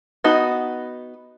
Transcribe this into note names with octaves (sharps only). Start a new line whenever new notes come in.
B3 D#4 F#4